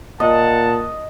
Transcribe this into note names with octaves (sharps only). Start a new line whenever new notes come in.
A#2 D#5 F#5 A5